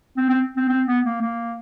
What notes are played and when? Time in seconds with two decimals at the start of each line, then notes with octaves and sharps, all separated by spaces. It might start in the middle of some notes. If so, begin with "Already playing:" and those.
0.17 C4
0.30 C4
0.57 C4
0.69 C4
0.88 B3
1.05 A#3
1.22 A#3